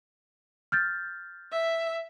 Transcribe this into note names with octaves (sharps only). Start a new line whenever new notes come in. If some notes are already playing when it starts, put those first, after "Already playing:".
F6 G6 A6
E5